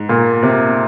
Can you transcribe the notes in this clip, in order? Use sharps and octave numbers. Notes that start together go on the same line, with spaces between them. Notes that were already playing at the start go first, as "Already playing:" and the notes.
Already playing: G#2
A#2
C3